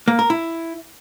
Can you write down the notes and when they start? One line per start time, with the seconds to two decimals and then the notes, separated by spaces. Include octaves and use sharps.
0.08 A#3
0.19 A#4
0.30 E4